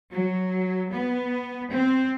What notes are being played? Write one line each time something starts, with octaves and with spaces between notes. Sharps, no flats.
F#3
B3
C4